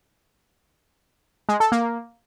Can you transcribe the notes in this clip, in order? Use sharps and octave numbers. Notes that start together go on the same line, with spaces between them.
G#3
A4
A#3